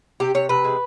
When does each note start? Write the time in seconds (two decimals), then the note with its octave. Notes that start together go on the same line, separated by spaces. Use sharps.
0.20 C3 G4
0.34 C3 C#5
0.49 C3 B4
0.64 G#3